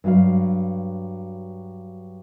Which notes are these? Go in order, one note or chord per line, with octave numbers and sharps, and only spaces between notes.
G2 F#3 F5